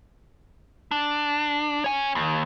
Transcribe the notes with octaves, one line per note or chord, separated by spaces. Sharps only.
D4
C#5 G#5
D#2